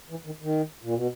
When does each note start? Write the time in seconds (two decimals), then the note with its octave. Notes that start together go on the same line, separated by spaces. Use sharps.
0.10 E3
0.26 D#3
0.42 D#3
0.83 A#2
0.96 B2